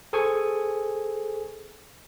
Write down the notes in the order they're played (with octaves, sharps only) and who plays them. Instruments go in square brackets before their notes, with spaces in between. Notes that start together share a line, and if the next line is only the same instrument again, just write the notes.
[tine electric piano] G#4 A4 C5 G#5 C#6